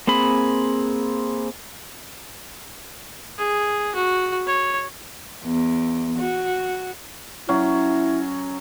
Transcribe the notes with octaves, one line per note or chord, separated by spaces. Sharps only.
A#3 C4 G#4 B5
G#4
F#4
C#5
E2
F#4
F#3 C#4 E4